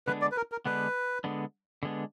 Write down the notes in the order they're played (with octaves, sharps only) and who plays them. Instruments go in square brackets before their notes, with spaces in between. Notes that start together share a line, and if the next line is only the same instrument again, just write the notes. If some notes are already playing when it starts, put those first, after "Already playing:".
[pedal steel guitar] D3 G#3 B3 D4 [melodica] B4
[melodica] D5
B4
A#4
A#4
[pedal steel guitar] D3 G#3 B3 D4 [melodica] B4
[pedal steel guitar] D3 G#3 B3 D4
D3 G#3 B3 D4